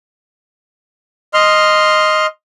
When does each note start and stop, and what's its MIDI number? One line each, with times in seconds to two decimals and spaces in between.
1.34 2.26 75
1.34 2.26 84
1.34 2.26 89